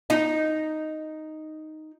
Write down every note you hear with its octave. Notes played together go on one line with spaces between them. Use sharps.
D#4 D#5